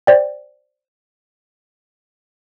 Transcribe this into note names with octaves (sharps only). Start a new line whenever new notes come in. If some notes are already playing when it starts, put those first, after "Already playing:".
C5 D5 G5